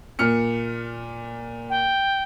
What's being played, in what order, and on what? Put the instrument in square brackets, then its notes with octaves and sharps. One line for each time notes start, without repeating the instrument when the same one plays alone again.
[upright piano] A#2 F6 C#7
[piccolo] G5